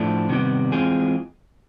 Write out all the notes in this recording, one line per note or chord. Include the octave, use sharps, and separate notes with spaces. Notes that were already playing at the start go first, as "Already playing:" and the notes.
Already playing: A2 F3 A3 D4
C3 D#3 G3 B3
E3 G#3 C4 F4 G#4